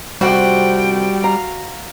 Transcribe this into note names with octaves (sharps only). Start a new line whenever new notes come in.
F2 C3 G3 F#4 G5
F5 A#5